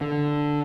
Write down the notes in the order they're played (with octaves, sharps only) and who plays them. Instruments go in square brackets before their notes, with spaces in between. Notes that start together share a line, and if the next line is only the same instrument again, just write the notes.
[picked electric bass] D3